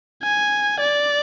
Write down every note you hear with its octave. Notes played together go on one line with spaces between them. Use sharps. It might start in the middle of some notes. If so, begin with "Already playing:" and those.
G#5
D5